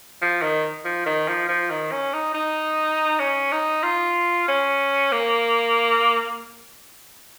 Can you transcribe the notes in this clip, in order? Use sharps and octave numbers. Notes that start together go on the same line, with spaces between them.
F3
D#3
F3
D#3
F3
F3
D#3
C#4
D#4
D#4
C#4
D#4
F4
C#4
A#3